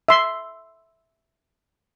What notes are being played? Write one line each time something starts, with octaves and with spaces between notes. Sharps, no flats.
E5 C6